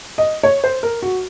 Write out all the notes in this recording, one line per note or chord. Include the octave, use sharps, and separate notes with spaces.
D#5
C#5
C5
A#4
F#4